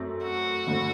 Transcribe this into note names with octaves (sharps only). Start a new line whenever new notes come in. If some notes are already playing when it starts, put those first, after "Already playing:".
Already playing: F#2 F#3 A3 C4
F#4
D2 D3 A3 C4